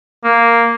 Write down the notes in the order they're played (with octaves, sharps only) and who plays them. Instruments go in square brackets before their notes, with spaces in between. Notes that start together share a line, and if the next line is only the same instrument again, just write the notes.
[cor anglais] A#3